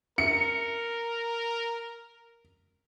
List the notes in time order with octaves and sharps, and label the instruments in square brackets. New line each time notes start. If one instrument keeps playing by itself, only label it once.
[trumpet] A#4 [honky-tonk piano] C#7